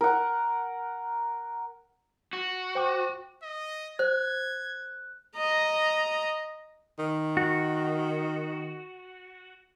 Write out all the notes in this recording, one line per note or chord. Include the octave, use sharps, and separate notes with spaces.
A#4 F#5
F#4
C5 G5 D6
D#5
C5 F#6 G#6
D#5 A#5
D#3
F#4